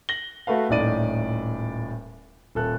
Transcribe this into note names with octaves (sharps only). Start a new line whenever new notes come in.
A#6 F#7 G7
A3 F#4 B4 F5
D#1 A2 D#4 D5 D#7
D#1 A4 F#6